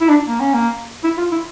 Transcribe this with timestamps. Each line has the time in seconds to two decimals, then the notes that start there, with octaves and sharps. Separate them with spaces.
0.01 E4
0.09 D4
0.28 A#3
0.40 C#4
0.54 A#3
1.04 E4
1.17 F4
1.31 E4